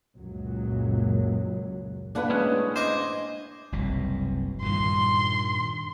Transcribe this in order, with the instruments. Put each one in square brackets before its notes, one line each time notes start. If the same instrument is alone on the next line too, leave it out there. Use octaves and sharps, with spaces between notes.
[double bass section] C#2 F#2 A#2 F#3
[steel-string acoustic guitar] A2 A#3 F#5 [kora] D4 B4
[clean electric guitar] G#3 C#4
[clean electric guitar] C5 [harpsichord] D#5 G#5 D6
[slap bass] F#1 C2 B2
[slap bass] G2 A#2 D#3 [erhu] C6